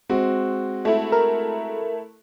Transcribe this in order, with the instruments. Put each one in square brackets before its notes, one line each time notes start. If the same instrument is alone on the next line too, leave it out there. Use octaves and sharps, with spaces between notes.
[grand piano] G#3 C4 F#4
[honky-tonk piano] A3 E4
[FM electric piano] A#4